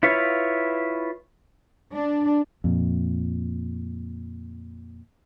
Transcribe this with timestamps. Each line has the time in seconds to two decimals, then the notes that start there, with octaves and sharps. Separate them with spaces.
0.03 E4 F4 B4 C#5 F5
1.94 D4
2.64 F2 A#2